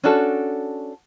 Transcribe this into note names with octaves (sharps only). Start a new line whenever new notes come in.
C#4 D4 F#4 A4